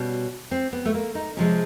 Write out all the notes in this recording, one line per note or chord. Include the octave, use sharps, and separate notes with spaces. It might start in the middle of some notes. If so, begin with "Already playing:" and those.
Already playing: B2 G3 C#4
C4
B3
A3
A#3
D#4
C3 F3 G#3 C#4